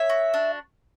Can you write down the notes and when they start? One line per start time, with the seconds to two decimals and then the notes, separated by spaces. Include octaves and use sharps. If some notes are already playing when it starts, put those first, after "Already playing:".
Already playing: C#5 E5
0.09 F#4
0.34 D4